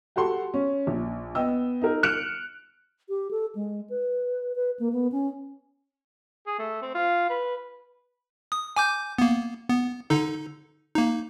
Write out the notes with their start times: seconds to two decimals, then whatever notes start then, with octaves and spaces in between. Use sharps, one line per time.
0.16 F#4 G4 A4 F#5 C6
0.54 C#4
0.87 A#1
1.35 B3 D#5 G5 E6
1.82 D#4 A#4
2.03 F6 F#6 C#7 D7 E7 F7
3.09 G4
3.31 A4
3.55 G#3
3.90 B4
4.56 B4
4.79 A#3
4.93 B3
5.12 C#4
6.46 G#4
6.59 A3
6.82 C4
6.95 F4
7.29 B4
8.52 D#6
8.76 G#5 D6 G6
9.18 A#3 B3
9.69 B3
10.10 D3 D#4 A4
10.95 A#3 D#4